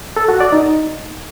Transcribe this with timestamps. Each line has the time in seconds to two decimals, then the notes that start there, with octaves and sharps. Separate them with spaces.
0.16 A4
0.28 F#4
0.40 D5
0.52 D#4